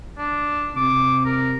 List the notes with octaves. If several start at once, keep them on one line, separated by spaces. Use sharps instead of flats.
D4
C3 D6
A#4